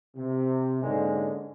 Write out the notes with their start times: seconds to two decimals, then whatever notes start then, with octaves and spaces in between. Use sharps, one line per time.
0.16 C3
0.82 G#2 D3 G#3 A#3 C#4